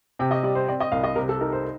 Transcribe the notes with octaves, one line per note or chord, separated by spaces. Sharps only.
C3 G5
D#5
G3 D5
C5
C4 D5
D#5
C2 F5
D#5
C3 A#4
A4
D#4 A#4
C5